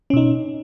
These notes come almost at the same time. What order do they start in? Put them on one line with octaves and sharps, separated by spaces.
C#4 B2 D#4